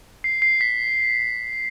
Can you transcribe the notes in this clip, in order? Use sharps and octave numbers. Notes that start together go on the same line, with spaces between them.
C7
C7
B6